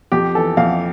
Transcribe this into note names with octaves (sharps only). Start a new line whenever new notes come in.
F2 G4
E3 A4
F2 F5